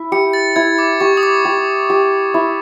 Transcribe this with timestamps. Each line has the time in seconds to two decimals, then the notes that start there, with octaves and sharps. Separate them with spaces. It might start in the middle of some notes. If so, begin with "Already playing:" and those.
Already playing: E4
0.12 G4 C#7
0.33 A6
0.56 E4 G#6
0.79 D6
1.00 G4 C#6
1.17 D#6
1.23 D6
1.45 G4
1.90 G4
2.34 E4